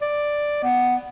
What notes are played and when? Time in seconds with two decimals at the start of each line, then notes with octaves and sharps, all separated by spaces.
0.02 D5
0.63 B3